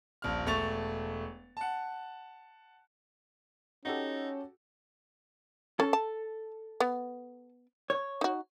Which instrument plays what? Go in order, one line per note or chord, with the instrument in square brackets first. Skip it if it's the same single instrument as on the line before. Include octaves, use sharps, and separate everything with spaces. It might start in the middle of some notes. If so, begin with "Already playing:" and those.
[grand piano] D#1 A#1 F6
E1 A3 C#6 A6 F7
F#5 A5
[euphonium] C#4 [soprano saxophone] D#4 [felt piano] F#4 G4 A4
[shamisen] C#4 [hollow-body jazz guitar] A4
[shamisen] A5
B3
[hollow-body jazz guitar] C#5
[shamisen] D#4 F#4